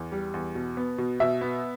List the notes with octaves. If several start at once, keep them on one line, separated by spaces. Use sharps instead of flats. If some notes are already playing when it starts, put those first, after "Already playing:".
Already playing: E2
G3
E2
B2
B3
B2
B2 E5
B3